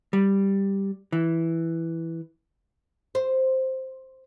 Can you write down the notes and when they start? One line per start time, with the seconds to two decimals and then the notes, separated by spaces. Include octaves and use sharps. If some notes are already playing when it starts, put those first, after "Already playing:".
0.13 G3
1.12 E3
3.15 C5